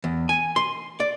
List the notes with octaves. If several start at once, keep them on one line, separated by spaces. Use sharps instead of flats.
E2
G#5
C6
D5